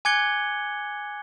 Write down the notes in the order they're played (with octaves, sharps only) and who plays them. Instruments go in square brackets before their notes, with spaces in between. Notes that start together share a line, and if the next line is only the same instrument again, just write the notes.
[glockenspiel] G#5 D6 F#6 G#6 C#7 G7